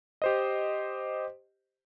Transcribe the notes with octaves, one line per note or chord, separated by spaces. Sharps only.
G4 C5 D#5